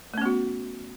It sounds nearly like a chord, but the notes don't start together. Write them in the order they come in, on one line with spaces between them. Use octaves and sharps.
A3 C#4 B3 F#4